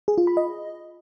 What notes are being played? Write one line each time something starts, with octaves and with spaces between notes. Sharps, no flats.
G#4
F4
B5
D#5